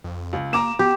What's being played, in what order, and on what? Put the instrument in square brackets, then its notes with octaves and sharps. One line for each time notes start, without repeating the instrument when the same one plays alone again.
[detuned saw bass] F2
[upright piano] C#2
[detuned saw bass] A#3 [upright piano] A#5 D6 E7
[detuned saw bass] B3 [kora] G4